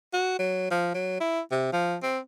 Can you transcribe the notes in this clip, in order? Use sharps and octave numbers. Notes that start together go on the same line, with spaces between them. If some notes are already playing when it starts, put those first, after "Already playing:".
F#4
F#3
F3
F#3
E4
C3
F3
C4